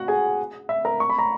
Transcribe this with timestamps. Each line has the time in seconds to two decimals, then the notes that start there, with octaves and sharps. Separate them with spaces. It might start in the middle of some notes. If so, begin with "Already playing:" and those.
Already playing: F#4 F#5
0.08 G#4 G#5
0.69 E5
0.85 A#4 A#5
1.00 C#6
1.09 B5
1.18 A#5